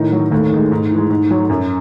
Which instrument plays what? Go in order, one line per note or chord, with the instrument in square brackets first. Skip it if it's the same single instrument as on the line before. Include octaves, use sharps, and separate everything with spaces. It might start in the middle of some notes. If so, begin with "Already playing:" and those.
Already playing: [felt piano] A2 D#3 D#4
F#3
D#2 A3
D#3 G#3
G#2
E3 G#3
G#2
F#3
F#2